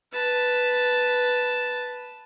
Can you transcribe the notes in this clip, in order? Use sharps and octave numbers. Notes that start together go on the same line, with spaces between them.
B4 A5